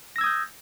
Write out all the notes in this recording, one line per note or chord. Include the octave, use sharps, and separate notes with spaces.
D#6 E6 G6 G#6 A#6